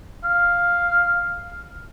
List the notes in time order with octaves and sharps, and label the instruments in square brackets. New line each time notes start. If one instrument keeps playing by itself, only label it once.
[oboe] F5